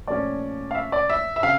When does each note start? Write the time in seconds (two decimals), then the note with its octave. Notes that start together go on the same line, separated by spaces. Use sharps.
0.07 A#2 F3 A3 C#4 D5
0.71 F5
0.75 E5
0.92 D5
1.09 E5
1.36 E5
1.43 C#3 F5